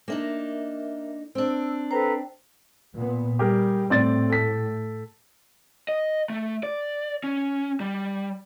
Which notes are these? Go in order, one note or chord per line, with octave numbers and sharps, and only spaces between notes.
A#3 D4 D#4 A#4 E5
C4 D4 E6
A4 B4 C5 G5 A#5
A#2 B3
G3 G4 G#4 A#4
A2 C4 D5 A6
A4 B6
D#5
A3
D5
C#4
G3